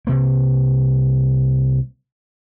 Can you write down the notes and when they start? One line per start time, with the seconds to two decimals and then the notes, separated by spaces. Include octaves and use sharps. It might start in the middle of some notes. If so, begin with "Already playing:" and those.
0.07 C2 C3 A#3